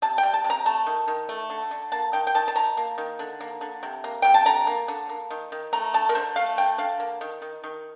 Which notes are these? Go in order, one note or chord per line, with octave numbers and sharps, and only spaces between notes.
C3 A5
G5
G3
A5
C3
A#5
A3 A5
D#3
D#3
A3
D3
D3
A#3 A5
D#3 G5
G5
D#3 A5
A5
D#3 A#5
A#3
D#3
D3
A#3
D3
C3
A#3
C3 G5
A5
D3 A#5
A#3
D3
A#3
D#3
D#3
A3 A#5
D3 A5
A#4
D3 C5
A3 F5
D3 G5
D3 F5
A#3
D#3
D#3
D#3